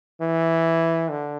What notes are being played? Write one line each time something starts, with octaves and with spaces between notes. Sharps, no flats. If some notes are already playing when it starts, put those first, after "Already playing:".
E3
D3